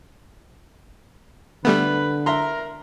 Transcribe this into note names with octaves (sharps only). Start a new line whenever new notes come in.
D3 G3 A3 B3 B4
A#4 E5 A#5 C6